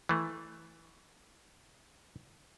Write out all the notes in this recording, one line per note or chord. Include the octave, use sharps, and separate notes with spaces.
E3 A3